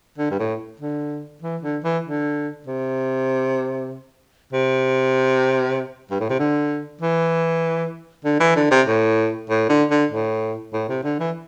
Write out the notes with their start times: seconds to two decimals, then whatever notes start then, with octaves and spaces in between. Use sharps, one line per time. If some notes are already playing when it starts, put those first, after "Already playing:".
0.18 D3
0.31 G2
0.40 A2
0.80 D3
1.42 E3
1.63 D3
1.84 E3
2.05 D3
2.66 C3
4.53 C3
6.11 G2
6.20 A2
6.29 C3
6.39 D3
7.01 E3
8.25 D3
8.40 E3
8.56 D3
8.71 C3
8.87 A2
9.49 A2
9.69 D3
9.90 D3
10.11 A2
10.73 A2
10.89 C3
11.04 D3
11.20 E3